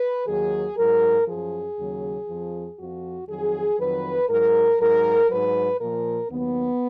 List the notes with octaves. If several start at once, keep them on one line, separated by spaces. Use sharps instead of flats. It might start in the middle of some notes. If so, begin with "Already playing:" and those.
Already playing: B4
D#2 D#3 F#3 G#4
G#2 F#3 A#4
F#2 F3 G#4
D#2 C#3 F#3
F2 F3
F2 F3 F#4
F2 D#3 F#3 G#4
F2 D#3 F#3 B4
G#2 F#3 A#4
G#2 F#3 A#4
G#2 F#3 B4
A#2 F3 A#4
D#2 D#3 F#3 B3